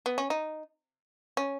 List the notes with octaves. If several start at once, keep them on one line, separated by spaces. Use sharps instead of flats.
B3
C#4
D#4
C#4